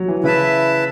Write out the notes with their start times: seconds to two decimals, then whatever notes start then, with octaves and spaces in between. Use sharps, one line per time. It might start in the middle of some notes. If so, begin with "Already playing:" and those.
Already playing: F#3
0.08 E3
0.23 C#3 E4 B4 E5 A5